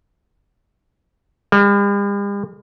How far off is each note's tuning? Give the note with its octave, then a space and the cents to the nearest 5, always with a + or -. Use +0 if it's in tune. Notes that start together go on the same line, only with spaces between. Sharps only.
G3 +45